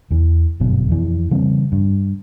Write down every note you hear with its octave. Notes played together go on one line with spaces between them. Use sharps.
E2 E3
G1 F#2 B2
F2 E3
C#3 E3 G3 C4
G2